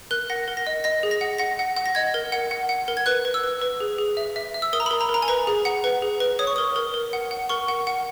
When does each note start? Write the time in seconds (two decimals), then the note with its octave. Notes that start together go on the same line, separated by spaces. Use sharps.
0.11 A#4 F#6
0.30 F#5 A#6
0.48 A#4
0.57 A#6
0.67 D#5
0.84 D#5 A#6
1.03 G#4
1.11 A#6
1.21 F#5
1.38 F#5 A#6
1.59 F#5
1.77 F#5
1.86 A#6
1.95 D#5 G#6
2.14 A#4
2.32 F#5
2.51 F#5
2.69 F#5
2.88 A#4
2.97 G#6
3.06 B4 F#6
3.25 B4
3.34 E6
3.44 B4
3.62 B4
3.80 G#4
3.98 G#4
4.17 E5
4.36 E5
4.54 E5
4.62 E6
4.73 A#4 D#6
4.80 A#5
4.86 B5
4.91 A#4
5.01 A#5
5.09 A#4
5.14 A#5
5.22 G#5
5.28 B4 A#5
5.47 G#4
5.65 F#5
5.84 B4
6.02 G#4
6.20 B4
6.39 C#5 D#6
6.47 C#6
6.56 A#4 D#6
6.76 A#4
6.94 A#4
7.13 F#5
7.31 F#5
7.49 A#4 C#6
7.68 F#5
7.87 F#5